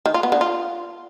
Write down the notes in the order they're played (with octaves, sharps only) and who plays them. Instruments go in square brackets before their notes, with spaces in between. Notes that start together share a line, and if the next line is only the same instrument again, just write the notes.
[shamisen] D#3
F4
B3
D3
F4